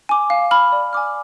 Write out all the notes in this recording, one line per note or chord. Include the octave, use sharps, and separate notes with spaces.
G#5 D6
F5
B5 F6
D5
G#5 D6 F6